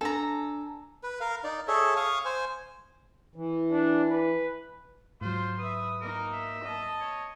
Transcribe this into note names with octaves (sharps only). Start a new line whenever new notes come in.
D4 A4 G#5 A#5
B4
A#4 F5
D#4 D5
G#4 A4 C#5 E5
F5 C#6 D#6
C5 G#5
E3
D4
B4
G#2 F#3 F4 C5
B4 E5 D#6
A#3 D#4 A#4
E5
D#5 A5
C#5